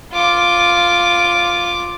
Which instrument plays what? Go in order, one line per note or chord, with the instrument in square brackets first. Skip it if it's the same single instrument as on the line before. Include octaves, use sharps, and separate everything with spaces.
[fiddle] F4 D6